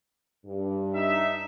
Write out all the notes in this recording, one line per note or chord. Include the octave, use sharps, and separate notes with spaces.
G2
D#4 E5